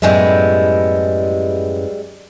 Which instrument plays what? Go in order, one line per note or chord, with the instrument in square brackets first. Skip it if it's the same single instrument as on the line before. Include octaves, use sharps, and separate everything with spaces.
[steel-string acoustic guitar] F#2 A2 B3 [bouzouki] G3 G#3 E4